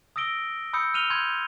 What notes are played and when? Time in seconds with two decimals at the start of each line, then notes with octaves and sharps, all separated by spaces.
0.16 D#6 E6 A#6 D7 G7
0.73 B5 D#6 E6 G6 C#7
0.94 F6 D#7 F7 G7
1.10 B5 C6 G6 G#6